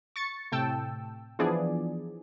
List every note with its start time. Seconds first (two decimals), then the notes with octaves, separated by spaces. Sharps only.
0.16 C#6 A6 C#7
0.52 A2 C3 G5 A5 E6
1.39 E3 F3 B3 D4 G#4 D5